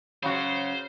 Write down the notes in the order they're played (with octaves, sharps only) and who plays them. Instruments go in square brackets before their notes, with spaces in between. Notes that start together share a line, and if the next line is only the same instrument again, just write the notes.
[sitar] C#3 F#3 F#4 [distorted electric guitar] C5